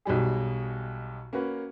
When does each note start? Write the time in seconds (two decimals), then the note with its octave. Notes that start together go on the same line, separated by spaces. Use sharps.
0.05 B1 B2 G3 G#4
1.33 A#3 C#4 F#4 B4